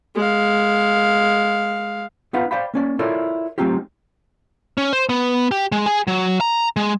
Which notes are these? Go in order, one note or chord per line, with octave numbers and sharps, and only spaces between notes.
G#3 F5
B3 D#4 F4 B4 F5 F#5
C5 D5 F5 G5 B5
A#3 C#4 D5
E4 F4 A4 A#4 C#5 D5
F#3 A3 C4 D#4 F4 G4
C#4
C5
B3
G4
G#3
G#4
F#3
A#5
G#3